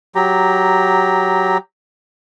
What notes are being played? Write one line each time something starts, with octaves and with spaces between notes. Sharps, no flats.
F#3 G4 A#5